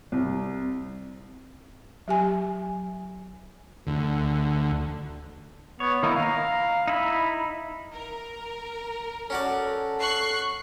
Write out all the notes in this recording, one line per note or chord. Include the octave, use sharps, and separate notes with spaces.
C2
F#3 G4 G#5
D2
B3 C#5
D#3 A#3 D#4 E4
F5 A#5
D#4 E4 B5
A#4
C#4 F#4 A4 D5
C#6 F#6 C7